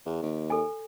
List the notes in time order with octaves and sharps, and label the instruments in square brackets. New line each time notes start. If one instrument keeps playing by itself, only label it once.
[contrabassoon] E2
D#2
[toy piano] A4 G#5